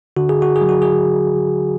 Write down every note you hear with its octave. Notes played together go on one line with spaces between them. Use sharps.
D3 F#4
G#4
F#4
G#4
F#3
F#4
G#4